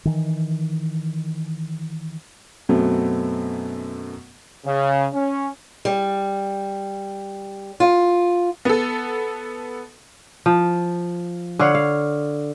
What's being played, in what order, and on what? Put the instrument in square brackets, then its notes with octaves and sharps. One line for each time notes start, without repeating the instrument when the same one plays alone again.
[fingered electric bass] D#3 E3
[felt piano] F#2 B2 F#3 A3 B3 C4
[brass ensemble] C#3
C#4
[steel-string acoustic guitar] G3
F4
[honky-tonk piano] B3 A4
[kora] F3
D3 C#5 F5 F#5
F5